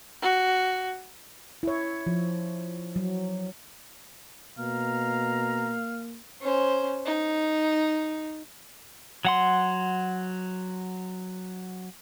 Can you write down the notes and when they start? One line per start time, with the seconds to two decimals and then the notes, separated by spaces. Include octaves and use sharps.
0.22 F#4
1.63 E4 C#5
2.07 F3
2.96 F#3
4.58 B2 A#3 F5 A#5
6.41 C#4 C5
7.06 D#4
9.25 F#3 F#5 C6